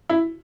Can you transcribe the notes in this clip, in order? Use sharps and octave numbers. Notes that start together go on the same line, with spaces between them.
E4